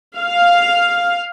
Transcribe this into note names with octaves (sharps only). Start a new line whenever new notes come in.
F5